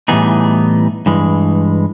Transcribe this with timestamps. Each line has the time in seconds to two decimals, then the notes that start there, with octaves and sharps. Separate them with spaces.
0.08 A2 E3 G3 B3 D#4 G#4
1.06 G2 E3 G#3